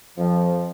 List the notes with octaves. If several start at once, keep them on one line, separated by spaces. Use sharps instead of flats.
F2 F3